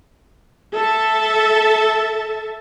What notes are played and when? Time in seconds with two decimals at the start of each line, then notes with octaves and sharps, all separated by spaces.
0.74 A4 E5 A5